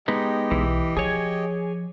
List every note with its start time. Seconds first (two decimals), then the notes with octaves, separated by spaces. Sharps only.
0.08 G#3 B3 D#4 G4 D#5 G5
0.51 B1 E3
0.97 F3 G#4 C#5 G#5